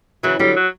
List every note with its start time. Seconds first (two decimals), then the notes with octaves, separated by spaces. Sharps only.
0.23 C#3 E3 F#3
0.39 D3 F#3 G3
0.56 F#3